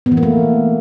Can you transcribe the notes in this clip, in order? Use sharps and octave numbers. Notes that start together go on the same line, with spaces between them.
B3
E3
A#3
A3